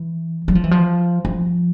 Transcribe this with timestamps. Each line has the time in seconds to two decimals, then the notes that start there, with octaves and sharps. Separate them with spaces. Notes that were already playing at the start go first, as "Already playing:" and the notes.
Already playing: E3
0.48 F#3
0.55 F3
0.64 E3
0.71 F3
1.25 F3